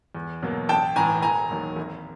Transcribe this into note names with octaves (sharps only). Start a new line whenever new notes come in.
E2
B2 F#3 A#3
A1 G5 A5
A2 E3 G#5 A#5
E1 G#5 A#5
D#2 D#3 F#3 A#3
G#1